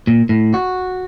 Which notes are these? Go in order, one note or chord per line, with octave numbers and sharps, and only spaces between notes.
A#2
A2
F#4